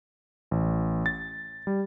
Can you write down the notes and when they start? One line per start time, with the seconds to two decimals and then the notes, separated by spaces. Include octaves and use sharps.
0.51 A1
1.06 A6
1.67 G3